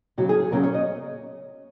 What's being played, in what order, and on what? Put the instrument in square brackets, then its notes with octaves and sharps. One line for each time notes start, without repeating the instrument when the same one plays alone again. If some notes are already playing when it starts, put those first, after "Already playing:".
[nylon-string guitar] D#2 C#3 F#3 C#4 F#4
G#4
G#4
E2 C#3 F#3 A#3 C#4 A#4
C#5
D#5